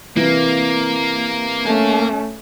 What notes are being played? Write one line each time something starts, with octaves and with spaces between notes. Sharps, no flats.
C3 E3 A#3
A3 C#4